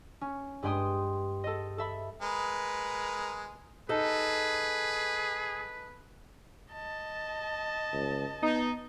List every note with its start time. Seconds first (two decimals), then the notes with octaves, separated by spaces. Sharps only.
0.21 C#4
0.62 G2 G#3 B3 G5 C6 D#6
1.44 A4 D#5
1.78 A4 E5 B5
2.22 G#3 A#4 B4
3.89 D#4 G#4 A4 B4
6.73 D#5 A5
7.93 C#2
8.42 B3 D#4